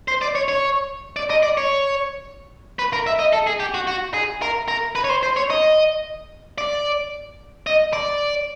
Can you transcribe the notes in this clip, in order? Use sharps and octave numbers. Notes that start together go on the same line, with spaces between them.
C5
D5
C#5
C#5
D5
D#5
D5
C#5
B4
A#4
E5
D#5
A4
G#4
G4
F#4
F#4
G#4
A#4
A#4
B4
C#5
C5
C5
C#5
D#5
D5
D#5
D5